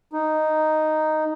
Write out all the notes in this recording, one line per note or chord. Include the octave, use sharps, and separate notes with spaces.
D#4